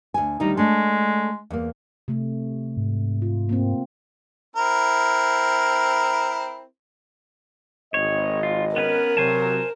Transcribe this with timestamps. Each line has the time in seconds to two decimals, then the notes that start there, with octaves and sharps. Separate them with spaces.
0.14 D2 G#5
0.40 D2 D#3 G3 D#4
0.57 G#3 A3 D4
1.50 E2 A#3
2.08 C3 A3
2.77 G#2
3.22 F4
3.49 A#3 C4
4.56 C4 E4 A#4
7.94 G#1 C#5 D#5
8.43 F4
8.76 B3 C#4 A#4 B4
9.17 C3 F#3 C5 G#5 A5